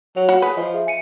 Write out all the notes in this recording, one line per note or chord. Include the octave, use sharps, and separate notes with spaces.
F#3 C#5 F#5 F7
F#4
G#4 B4
F3 D#5
G#4 E5
G#5 C#7 D#7